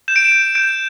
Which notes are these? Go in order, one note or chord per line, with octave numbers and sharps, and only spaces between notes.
G6 E7
D7
E7
G6
G6 D7